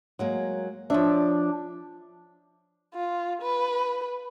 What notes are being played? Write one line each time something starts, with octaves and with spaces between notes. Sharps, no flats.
F#3 G#3 A#3
F3 D4 C#5 E5
F4
B4